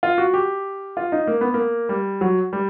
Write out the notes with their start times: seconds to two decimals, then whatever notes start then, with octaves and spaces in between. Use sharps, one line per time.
0.03 F4
0.18 F#4
0.34 G4
0.97 F4
1.12 D#4
1.27 A#3
1.41 B3
1.54 A#3
1.89 G3
2.21 F#3
2.53 G3